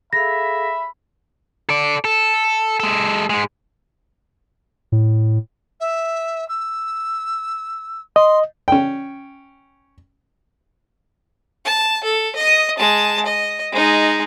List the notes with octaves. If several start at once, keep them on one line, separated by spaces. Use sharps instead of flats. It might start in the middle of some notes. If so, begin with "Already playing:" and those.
G#4 A4 E5 F5 B5 A#6
A4 D5
A4
G#3 A4
G#2 G#3
A2
E5
E6
D#5 C6
C#4 G5
A5
A4
D#5 D#6
G#3 A5
D#5
G#3 D#4